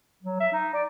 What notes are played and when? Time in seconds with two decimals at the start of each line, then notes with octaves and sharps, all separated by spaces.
0.22 F#3
0.40 E5
0.53 D#4
0.74 D5